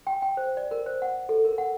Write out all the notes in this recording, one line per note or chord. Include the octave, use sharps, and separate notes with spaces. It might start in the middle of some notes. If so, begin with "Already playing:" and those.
G5
G5
C5
D5
A#4
C5
F#5
A4
A#4
F#5